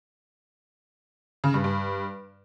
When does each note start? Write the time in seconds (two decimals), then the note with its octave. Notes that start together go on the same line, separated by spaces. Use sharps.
1.44 C#3
1.54 G2
1.64 G2